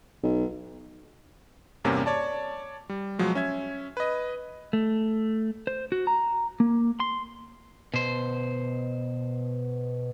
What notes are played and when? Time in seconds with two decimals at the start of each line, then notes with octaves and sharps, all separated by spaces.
0.23 B1
1.84 E2 G2 C3 A#3 C#4
2.06 C#5 D5 A5
2.89 G3
3.19 B2 F3 F#3 G#3
3.35 C#4 E5 G#6
3.97 B4 D#5
4.73 A3
5.67 C5
5.92 F#4
6.07 A#5
6.60 A#3
7.00 C6
7.94 B2 C5